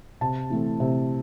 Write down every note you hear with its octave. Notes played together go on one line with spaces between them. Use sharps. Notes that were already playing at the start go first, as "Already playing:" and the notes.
C3 A5
E3 A3 C4
C3